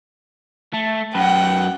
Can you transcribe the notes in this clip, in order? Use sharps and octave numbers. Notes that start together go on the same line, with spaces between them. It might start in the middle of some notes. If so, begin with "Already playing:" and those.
A3
F#2 B4 F#5 G5